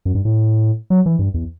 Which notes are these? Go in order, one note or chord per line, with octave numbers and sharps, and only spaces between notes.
F#2
G2
A2
F#3
E3
G2
E2